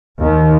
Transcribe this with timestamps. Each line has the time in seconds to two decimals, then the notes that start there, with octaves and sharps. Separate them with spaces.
0.20 D#2